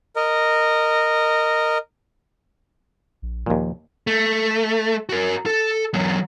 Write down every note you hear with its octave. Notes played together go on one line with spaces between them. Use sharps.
A#4 D#5
A#1
D#2 A#2 F3
A3
F#4 A#4
A4
E2 F#3